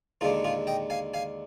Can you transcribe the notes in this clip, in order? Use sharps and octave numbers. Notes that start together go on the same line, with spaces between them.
D#2 D3 G#3 D4 F4 G#4
F4 G#4
D#5 G5
F5 G#5
F5 G#5